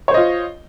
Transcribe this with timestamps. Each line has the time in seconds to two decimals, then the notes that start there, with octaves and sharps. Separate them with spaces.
0.08 C#5
0.11 C5
0.14 D#5
0.17 F4